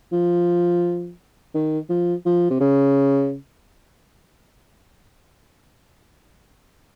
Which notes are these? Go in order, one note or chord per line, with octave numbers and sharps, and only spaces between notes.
F3
D#3
F3
F3
C3
C#3